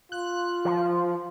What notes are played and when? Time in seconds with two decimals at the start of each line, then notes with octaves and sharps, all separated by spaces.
0.12 F4 F#6
0.65 F3